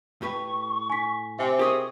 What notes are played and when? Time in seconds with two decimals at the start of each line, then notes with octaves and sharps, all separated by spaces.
0.22 A2 G4 B4 C#6
0.90 G#5 B6
1.39 C3 E5 G#5
1.59 G4 G#4 A#4 D#5 C#6 D#6